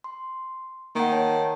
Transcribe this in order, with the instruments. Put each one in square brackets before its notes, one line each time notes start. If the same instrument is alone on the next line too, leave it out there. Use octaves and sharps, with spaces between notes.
[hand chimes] C6
[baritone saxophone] D#3 [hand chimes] A#3 F#5
[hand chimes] C#5 A5